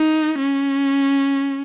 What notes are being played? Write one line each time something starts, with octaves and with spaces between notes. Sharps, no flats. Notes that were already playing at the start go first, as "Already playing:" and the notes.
Already playing: D#4
C#4